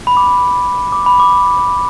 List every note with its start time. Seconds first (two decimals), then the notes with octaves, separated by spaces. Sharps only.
0.07 B5
0.17 D6
0.27 B5
0.92 D6
1.06 B5
1.20 D6